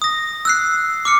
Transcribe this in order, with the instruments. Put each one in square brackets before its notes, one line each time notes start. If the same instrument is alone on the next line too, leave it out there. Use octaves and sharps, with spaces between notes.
[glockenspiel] D#6 A#6
E6 F#6 C7
D6 F6 C#7